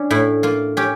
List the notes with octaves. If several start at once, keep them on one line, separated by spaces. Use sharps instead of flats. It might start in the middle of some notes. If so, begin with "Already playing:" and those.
Already playing: C#4 D4
A2 E4
A#3 F4
C#4 G4